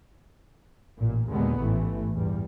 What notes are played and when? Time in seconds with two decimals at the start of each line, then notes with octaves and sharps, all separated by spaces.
0.97 A1 A#2
1.30 D#2 A#2 D3 G#3 B3
1.63 A1 G#2 E3 A3
2.14 E2 G2 G3